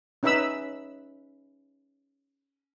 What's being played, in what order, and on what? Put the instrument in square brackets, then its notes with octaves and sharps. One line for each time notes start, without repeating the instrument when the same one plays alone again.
[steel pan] C#4 D#4 B4 E5 B5 E6